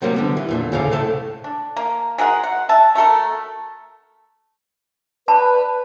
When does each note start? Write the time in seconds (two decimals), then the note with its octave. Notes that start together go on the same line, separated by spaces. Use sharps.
0.02 C3 F#3 G3 A#3 C#4
0.14 D3 G3 B3
0.37 E3
0.49 E2 A#2 D3
0.72 D2 A2 C#3 A4 D5 F5
0.91 A2 C3 A3 A4
1.44 D4
1.77 A#3
2.18 G#3 F#4 A#4 F#5
2.43 F#5
2.69 E5 A5
2.95 A3 F#4 A4 A#4
5.28 B4 D5 A5 B5